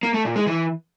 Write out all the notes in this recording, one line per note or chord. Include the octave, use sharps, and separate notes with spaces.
A#3
A3
A#2
G#3
E3